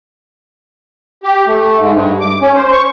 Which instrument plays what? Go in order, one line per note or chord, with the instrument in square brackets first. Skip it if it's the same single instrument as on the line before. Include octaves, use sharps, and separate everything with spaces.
[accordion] G4
A3
G#2
G2
D6
C#4
C5
C#6